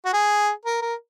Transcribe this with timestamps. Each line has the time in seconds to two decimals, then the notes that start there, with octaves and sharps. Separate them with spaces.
0.05 F#4
0.13 G#4
0.65 A#4
0.82 A#4